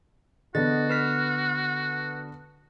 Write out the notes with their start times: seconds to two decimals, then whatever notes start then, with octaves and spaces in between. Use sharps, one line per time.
0.55 D3 B3 F#4 D#5 A6
0.90 B4 F6 B6